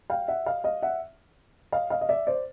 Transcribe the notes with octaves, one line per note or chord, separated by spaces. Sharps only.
F5 G5
E5 F#5
D#5 F5
D#5 F5
E5 F#5
D#5 F5
D#5 F5
D#5
D5 E5
C5 D5